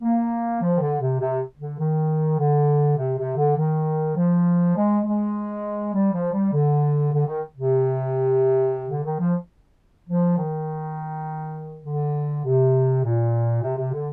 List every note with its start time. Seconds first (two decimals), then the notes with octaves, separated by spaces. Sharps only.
0.02 A#3
0.62 F3
0.76 D#3
0.81 D3
1.01 C3
1.20 C3
1.59 D3
1.79 D#3
2.38 D3
2.97 C3
3.18 C3
3.37 D3
3.57 D#3
4.16 F3
4.76 G#3
5.05 G#3
5.94 G3
6.13 F3
6.33 G3
6.52 D3
7.12 D3
7.26 D#3
7.56 C3
8.89 D3
9.04 D#3
9.19 F3
10.08 F3
10.37 D#3
11.85 D3
12.45 C3
13.04 A#2
13.62 C3
13.78 C3
13.93 D3